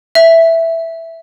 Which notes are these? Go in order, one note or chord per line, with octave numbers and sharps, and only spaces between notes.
E5